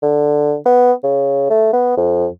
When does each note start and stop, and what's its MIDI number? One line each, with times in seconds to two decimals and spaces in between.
0.03 0.55 50
0.66 0.92 59
1.04 1.50 49
1.50 1.68 57
1.73 1.93 59
1.97 2.27 41